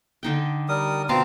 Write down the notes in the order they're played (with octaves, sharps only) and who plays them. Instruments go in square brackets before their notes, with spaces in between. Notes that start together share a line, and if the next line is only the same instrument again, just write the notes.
[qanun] D3 D#4 G5
[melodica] G3 A#4 D#6
[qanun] B2 F5 A5 [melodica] C4 F4 A#5